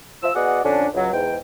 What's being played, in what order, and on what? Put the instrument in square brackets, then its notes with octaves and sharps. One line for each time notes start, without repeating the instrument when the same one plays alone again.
[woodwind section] F3 E6
B3 F#4 G#4 D5 D#5 F#5
F2 D3 C#4 D4
C#2 F#3
E2 G#2 G5